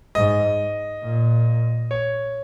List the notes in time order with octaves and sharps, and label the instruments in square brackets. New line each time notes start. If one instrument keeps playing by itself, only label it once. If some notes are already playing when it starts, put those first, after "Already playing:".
[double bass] G#2 [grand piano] D#5
[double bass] A#2
[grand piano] C#5